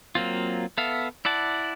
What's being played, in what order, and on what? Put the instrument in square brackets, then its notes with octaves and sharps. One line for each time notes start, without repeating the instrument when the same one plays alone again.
[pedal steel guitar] F#3 A#3 C4 F4
B3 A4 E5 F5
E4 D5 F#5 A5